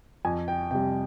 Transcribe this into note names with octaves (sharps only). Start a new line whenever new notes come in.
F2 G#5
G5
C3 G3 G5